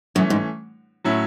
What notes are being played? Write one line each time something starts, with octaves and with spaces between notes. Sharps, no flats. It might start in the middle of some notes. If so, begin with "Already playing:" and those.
F#2 E3 A3 C#4
G#2
A2 F#3 A3 C#4 E4